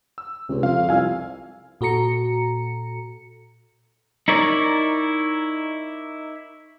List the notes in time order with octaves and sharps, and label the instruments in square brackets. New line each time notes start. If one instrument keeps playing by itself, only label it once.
[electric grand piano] E6
[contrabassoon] C#2 [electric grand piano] C3
[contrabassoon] F2 [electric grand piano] F5
[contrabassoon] C2 [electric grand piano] F5 G#5 E6
[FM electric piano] A#2 F#4 A4 A#5 C#7
[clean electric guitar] D#4 E4 A#4 C#5 D5